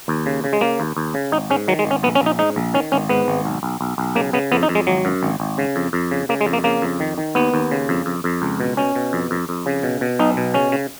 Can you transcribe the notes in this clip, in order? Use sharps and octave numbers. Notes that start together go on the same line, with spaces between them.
D#2
C#3
C#3
G#3
C#3 A#3
D#2
D#2
C#3
G#1 D#4
G#2 C#4
D#3 F#3
G#3
G#1
C#4
A#1 B3
C#4
A#1 D#4
G#2 D#4
A#1
D#3 C#4
G#1 C#4
G#2 B3
G#1
B1
B1
B1
B1
C#3 A#3
C#3 B3
F2 B3
D#4
F2
G#3
G#1 F#3
F#2
G#1
G#1
C#3
F2
F2
C#3
C#3 A#3
G#3
F2
A#3
C#3 A#3
F2
D#3
D#3
D#2 B3
D#2
C#3
F2
F2
F2
C#2
B2
B2 C#4
B2
F2
F2
F2
C#3
B2
B2
B1 D#4
B2
C#3 C#4
C#3